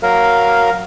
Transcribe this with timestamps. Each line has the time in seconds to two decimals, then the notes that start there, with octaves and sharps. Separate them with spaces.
0.03 F#3 A#4 F5